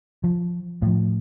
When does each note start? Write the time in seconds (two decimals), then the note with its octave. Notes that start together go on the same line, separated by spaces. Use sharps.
0.24 F3
0.82 A2 F3